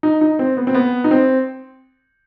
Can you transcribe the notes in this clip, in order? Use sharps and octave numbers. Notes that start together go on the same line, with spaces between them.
D#4
D#4
C4
B3
C4
B3
D#4
C4